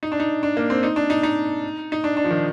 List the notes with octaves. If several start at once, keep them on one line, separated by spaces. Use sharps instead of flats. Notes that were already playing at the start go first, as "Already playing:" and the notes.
D#4
D4
D#4
D4
A#3
C4
D#4
D4
D#4
D#4
D#4
D4
D4
F3
D#3